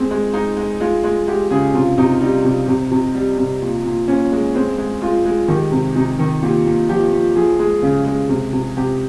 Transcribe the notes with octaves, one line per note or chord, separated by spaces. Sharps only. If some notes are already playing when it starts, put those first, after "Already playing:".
Already playing: G#3 C4
G#3
G#3 D#4
G#3
G#3 F4
G#3
G#3 G4
C#3 G#4
C3 F4
C3 D#4
G3 D#4
C3
C3
C3
G3
C3
A#2
A#2
A#2 C#4
G#3
G#3 C4
G#3
G#3 F4
G#3
D#3 G4
C3
C3 D#4
D#3
A#2 G4
A#2
F3 G4
A#2
F3 G#4
G#3 G#4
C#3
G#3
C3
C3
C3 G4